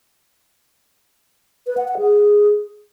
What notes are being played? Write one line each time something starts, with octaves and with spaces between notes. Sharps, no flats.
B4
F#5
F#5
G#4